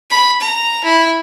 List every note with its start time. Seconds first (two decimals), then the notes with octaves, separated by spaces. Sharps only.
0.11 B5
0.41 A#5
0.84 E4